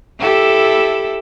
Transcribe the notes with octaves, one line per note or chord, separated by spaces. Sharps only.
E4 G4 A4